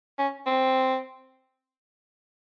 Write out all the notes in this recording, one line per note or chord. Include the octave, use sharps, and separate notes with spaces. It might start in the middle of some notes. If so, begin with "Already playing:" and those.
C#4
C4